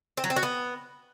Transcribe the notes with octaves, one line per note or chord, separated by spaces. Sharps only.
C4
F#3
C4
F#4
B3